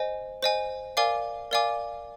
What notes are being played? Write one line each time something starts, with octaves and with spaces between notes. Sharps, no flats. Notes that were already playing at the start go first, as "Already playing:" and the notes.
Already playing: C5 D#5 G#5
C5 D#5 G#5
A#4 D5 F5 G#5 D6
A#4 D5 F5 G#5 D6